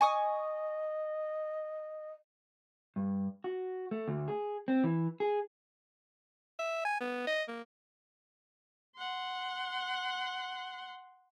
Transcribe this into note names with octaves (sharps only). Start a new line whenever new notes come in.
D#5 G#5 C#6 D#6
G2
F#4
A3
D2
G#4
C4
E3
G#4
E5
G#5
B3
D#5
A#3
F#5 C6